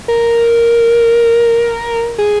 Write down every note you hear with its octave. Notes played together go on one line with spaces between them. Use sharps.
A#4
G#4